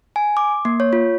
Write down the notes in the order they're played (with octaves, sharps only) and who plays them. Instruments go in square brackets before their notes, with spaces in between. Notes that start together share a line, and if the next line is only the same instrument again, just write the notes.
[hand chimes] G#5
D6
A#3
C#5
F4